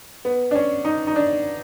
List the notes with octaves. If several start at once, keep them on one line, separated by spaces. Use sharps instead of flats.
B3
D4
C#4
D#4
D#4
D4